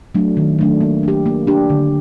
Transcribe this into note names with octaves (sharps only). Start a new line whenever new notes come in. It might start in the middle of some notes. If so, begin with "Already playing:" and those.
F#3 A3 D4
D#3
F#3 A3 D4
A#3
D4 G4
A#3
D4 G4
D3